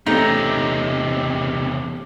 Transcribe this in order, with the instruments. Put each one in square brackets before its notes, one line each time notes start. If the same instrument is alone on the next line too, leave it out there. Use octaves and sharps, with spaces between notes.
[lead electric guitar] E2 C3 [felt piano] A3 C4 C#4 [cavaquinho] D#4 [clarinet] G4